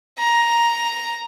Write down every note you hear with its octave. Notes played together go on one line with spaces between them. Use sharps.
A#5